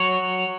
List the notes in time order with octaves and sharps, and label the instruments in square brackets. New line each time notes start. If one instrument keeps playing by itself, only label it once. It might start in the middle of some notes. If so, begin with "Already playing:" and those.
Already playing: [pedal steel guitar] F#3 C#5